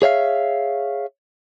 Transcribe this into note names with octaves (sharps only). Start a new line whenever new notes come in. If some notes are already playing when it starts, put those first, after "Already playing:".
G#4 C#5 E5 F5